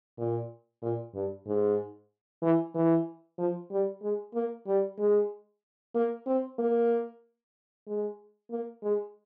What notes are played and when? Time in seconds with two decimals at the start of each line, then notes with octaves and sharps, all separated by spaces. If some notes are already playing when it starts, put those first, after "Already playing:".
0.18 A#2
0.82 A#2
1.14 G2
1.46 G#2
2.42 E3
2.75 E3
3.38 F3
3.71 G3
4.02 G#3
4.34 A#3
4.67 G3
4.99 G#3
5.95 A#3
6.26 C4
6.59 A#3
7.87 G#3
8.51 A#3
8.83 G#3